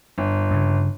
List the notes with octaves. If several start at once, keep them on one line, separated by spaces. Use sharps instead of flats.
G1
G2 C#3